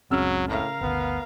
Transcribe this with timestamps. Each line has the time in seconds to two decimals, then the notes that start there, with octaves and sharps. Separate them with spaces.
0.11 F#1 C#2 C#3 F#3 C4 E6 F6
0.48 A2 A#4 F5
0.81 G1 D2 B3